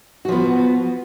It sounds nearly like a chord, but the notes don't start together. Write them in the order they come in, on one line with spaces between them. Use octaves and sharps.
F#4 F3 B3